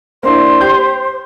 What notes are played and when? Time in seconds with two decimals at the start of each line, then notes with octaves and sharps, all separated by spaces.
0.23 A#3 D4 E4 C5
0.61 G4 G6